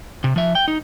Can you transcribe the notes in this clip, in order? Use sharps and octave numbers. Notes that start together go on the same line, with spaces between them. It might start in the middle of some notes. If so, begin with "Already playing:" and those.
C3
F3 E5
G5
D#4